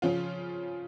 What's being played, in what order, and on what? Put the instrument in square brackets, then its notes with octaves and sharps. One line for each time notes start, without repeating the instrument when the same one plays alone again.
[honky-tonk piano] C#3 F3 C#4 F4